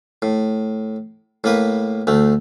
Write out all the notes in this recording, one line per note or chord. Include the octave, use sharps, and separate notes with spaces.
A2
A2 A#3 B4
D2 A3